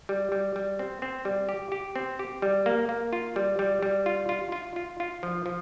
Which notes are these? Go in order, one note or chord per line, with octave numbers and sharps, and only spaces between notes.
G3
G3
G3
C4
C4
G3
G4
G4
C4
G4
G3
A#3
A#3
F4
G3
G3
G3
F4
F4
F4
F4
F4
F3
F3